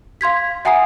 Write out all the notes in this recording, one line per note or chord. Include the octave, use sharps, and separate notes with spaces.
F5 C6 G#6 B6
E5 F#5 G#5 A#5 D#6 C7